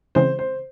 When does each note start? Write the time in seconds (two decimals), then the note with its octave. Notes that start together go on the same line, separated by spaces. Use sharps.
0.15 C#3 E3 G#3 C4 C5
0.39 C5